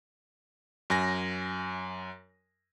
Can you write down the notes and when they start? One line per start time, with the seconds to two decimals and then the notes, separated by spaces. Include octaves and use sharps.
0.90 F#2 G#5 A#6